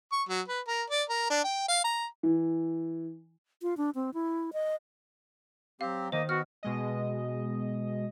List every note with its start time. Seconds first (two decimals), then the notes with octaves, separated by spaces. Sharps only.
0.12 C#6
0.29 F#3
0.48 B4
0.68 A#4
0.90 D5
1.10 A#4
1.30 D4
1.44 G5
1.68 F5
1.84 A#5
2.23 E3
3.62 F4
3.77 D4
3.95 C4
4.14 E4
4.53 D#5
5.81 F#3 C4 G4 F5
6.12 D#3 A#3 C5 D#5
6.29 B3 F#4 F6
6.63 B2 G#3 D#5